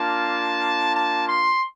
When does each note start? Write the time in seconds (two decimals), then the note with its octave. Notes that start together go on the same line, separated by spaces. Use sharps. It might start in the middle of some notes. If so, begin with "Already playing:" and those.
Already playing: A#3 D4 F4 A5
0.93 A5
1.25 C6